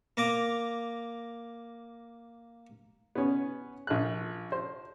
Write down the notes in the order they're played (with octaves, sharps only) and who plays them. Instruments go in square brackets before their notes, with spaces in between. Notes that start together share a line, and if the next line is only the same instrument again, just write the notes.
[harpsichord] A#3 A#5 D6
[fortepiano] B3 C#4
A#1 F#6
C5